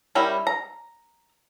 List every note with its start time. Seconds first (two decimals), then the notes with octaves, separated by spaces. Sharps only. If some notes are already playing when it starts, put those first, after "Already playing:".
0.15 G3 C#4 E4 A#4 G5
0.47 A#5